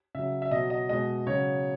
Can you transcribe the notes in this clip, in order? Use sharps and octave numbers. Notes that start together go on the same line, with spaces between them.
C#3 F#3 E5
E5
B2 F#3 D#5
D#5
B2 G#3 D#5
C#3 F#3 C#5